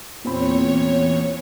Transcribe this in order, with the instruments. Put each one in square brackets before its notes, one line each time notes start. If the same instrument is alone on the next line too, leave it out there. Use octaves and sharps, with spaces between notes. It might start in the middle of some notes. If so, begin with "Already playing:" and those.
[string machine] E2 C#5 [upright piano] A#2 C4 B5